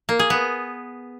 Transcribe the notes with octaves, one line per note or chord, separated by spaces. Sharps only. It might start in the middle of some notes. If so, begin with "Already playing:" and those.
A#3
G#4
B3